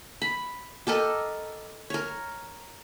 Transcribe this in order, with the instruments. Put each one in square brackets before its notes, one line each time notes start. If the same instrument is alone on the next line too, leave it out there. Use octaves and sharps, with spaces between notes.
[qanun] B5
G4 A4 A#4 D#5
A#4 C#5